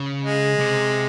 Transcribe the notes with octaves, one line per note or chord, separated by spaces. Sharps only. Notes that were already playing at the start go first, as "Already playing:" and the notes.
Already playing: C#3
G#3
C3